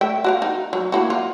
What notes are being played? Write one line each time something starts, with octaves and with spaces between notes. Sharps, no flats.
A3 E5 G5
F#4 D5 F5
D#4
F#3
A#3 E4 F#4
F4